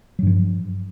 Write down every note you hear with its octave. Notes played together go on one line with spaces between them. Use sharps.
G2 F3 F#3